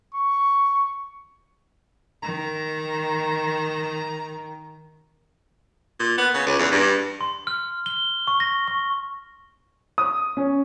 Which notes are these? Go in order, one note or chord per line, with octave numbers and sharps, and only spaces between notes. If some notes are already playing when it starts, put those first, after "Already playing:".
C#6
D#3 A#5
A#2
B3
C#3
C#2
E2
G2
C6
F6
G7
C#6
A#6
C#6
D#6
C#4